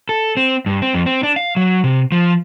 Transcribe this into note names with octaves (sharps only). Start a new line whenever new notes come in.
A4
C4
G2
C4
F2
C4
D4
F5
F#3
C3
F3